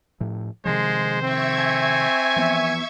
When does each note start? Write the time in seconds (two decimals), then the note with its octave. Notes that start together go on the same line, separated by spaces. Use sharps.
0.20 A2 F3
0.65 C3 D#3 F3 G#3 C5
1.22 C4 E5 C#6 G#6
1.59 G#5
2.36 E3 F3 B3